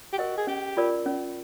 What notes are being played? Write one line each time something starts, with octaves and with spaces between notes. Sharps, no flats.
G4
F#4 A#4 D#5
G#4
C#4 G4
F4 A#4 D5
C#4